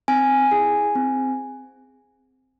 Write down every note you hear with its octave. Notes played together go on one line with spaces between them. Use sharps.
C4 G#5
E4 G#4
C4